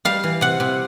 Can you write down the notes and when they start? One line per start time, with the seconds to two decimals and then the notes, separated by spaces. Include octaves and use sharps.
0.05 G3 F5
0.24 E3
0.41 C3 F#5
0.60 C3